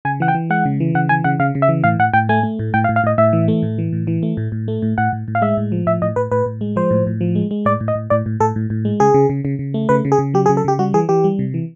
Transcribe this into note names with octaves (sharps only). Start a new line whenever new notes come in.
C#3 G#5
E3 F#5
G5
E3
G#3 F#5
C#3
E3
C#3 F#5
E3 G#5
C#3 F#5
C#3 F5
C#3
E5
E3
A2 F5
A2 F#5
A2 G5
A3 G#5
A3
A2
A2 G5
F5
A2
F5
A2 D#5
A2 E5
E3
A3
A2
E3
A2
E3
A3
A2
A2
A3
A2
A2 F#5
A2
A2
F5
G#3 E5
A2
F3
A2 E5
A2 D#5
A2 B4
A2 B4
A2
G#3
F3 C5
A2
A2
F3
G#3
G#3
A2 D5
A2
D#5
A2
A2 D5
A2
A2 A4
A2
A2
G#3
C#3 G#4
C#3
C#3
C#3
C#3
A3
C#3 B4
C#3
G#4
C#3
F#3 G4
G#4
C#3
A4
C#3 G4
G3 F#4
E3 G#4
E3 G4
G3
C3
E3